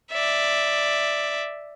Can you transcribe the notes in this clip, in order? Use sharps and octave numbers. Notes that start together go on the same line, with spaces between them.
D5 E5